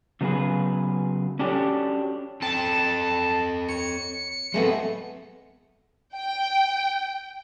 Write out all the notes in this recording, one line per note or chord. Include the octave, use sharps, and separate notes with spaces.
C#3 F#3 B3 F#4 G#4 B4
C#4 D4 F#4 G4 A4 C#5
C4 A4 G5 A5
C#5 C#7
F#3 G#3 A3 B3 C4
G5